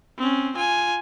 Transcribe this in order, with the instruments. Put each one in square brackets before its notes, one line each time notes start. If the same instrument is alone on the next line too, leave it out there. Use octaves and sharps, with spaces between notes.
[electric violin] C4 C#4
F4 G#5